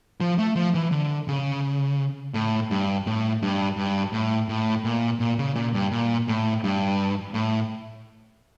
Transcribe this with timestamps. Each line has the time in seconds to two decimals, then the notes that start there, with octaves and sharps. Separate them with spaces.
0.21 F3
0.38 A3
0.56 F3
0.74 E3
0.92 D3
1.28 C#3
2.34 A2
2.71 G2
3.07 A2
3.42 G2
3.77 G2
4.13 A2
4.49 A2
4.85 A#2
5.20 A#2
5.38 C#3
5.55 A#2
5.74 G2
5.91 A#2
6.28 A2
6.64 G2
7.34 A2